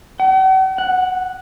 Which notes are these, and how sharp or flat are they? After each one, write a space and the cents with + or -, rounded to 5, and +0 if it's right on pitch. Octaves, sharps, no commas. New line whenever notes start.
F#5 +45
F#5 -5